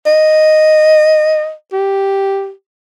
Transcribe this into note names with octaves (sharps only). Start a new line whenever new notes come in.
D#5
G4